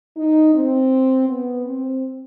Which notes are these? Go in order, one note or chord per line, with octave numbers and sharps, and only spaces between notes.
D#4
C4
B3
C4